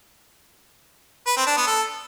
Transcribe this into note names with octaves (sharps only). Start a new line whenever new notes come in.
B4
C4
D4
B3
A4